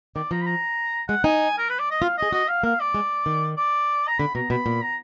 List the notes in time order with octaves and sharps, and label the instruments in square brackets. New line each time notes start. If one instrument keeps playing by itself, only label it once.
[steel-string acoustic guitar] D#3 [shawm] D5
[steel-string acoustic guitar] F3 [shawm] A#5
[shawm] B5
A#5
[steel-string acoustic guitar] G#3 [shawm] F#5
[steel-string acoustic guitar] D#4 [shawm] G#5
[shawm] A#4
B4
D5
D#5
[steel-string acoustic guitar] F4 [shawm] F5
[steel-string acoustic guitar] G#4 [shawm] D#5
[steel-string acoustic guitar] F#4 [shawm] D#5
[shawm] F5
[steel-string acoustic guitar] A#3 [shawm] F5
[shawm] D5
[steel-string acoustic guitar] G#3
D#3
[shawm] D5
A#5
[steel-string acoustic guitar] D3 [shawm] B5
[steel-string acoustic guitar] B2 [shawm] A#5
[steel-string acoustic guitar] B2 [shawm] B5
[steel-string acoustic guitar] A#2
[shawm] A#5